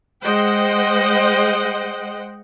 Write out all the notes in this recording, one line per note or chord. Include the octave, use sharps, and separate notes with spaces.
G#3 C5 D#5 F#5 G5